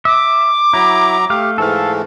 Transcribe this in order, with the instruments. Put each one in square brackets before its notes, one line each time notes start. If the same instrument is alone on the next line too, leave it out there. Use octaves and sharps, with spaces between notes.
[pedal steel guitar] E5 [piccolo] D6
[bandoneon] F#3 A#5 [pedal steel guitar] E4
[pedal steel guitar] A3 F5 [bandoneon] G4
[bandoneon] G#2 E3 A3 [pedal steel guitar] A4 F5